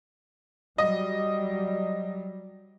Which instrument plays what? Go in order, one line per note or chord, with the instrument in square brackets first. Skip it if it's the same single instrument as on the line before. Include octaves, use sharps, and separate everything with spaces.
[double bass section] F#3 G3 [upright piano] D#5